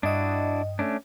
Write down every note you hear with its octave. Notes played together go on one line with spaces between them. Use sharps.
G2 D4 E4 F#4 D#5
A3 C#4 D4